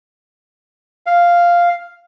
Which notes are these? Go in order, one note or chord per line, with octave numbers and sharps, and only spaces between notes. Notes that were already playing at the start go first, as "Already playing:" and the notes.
F5